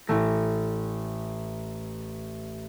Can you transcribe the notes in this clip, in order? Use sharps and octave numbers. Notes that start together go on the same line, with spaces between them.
A1 A3 A#6